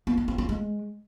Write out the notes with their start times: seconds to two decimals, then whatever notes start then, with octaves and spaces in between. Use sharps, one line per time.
0.07 B3
0.17 D4
0.28 C4
0.38 C#4
0.49 G#3